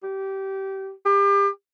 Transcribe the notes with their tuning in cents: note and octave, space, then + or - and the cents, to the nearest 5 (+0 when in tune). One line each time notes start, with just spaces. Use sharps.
G4 -20
G4 +35